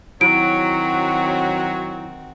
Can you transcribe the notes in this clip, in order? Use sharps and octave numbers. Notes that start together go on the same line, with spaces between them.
D#3 F#3 C4 E4 F#4 D7